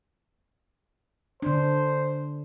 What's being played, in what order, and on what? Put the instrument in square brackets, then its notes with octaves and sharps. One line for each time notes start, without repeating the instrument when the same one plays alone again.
[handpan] D3 D4 [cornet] C5